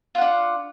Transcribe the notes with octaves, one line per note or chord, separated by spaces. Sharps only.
D4 F4 F#5